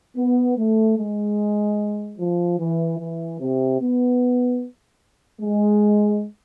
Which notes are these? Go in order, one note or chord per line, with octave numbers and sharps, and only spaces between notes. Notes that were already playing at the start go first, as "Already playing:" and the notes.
B3
A3
G#3
F3
E3
E3
C3
B3
G#3